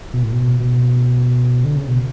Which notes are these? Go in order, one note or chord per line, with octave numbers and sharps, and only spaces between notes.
B2
A2
B2
B2
D3
C#3
B2